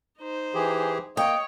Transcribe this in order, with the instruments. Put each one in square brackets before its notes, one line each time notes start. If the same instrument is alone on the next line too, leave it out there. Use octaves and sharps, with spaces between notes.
[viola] D#4 C5
[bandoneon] E3 G4 G#4
[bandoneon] A#3 [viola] C#5 [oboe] D#5 [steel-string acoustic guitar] G5